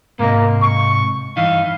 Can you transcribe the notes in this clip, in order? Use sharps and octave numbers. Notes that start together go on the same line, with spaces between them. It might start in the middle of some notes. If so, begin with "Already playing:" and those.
G#2 C3 A#3 D#5
C#6
G2 E3 D#4 F5